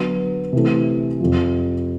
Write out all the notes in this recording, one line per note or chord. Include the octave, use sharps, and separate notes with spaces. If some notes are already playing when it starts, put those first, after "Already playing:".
Already playing: D3 F#3 B3
C3 E3 A3
F2 C3 F3